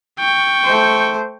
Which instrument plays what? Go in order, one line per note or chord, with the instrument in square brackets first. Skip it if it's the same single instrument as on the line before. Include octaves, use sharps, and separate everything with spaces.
[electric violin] G5 C#6
[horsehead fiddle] A3 C5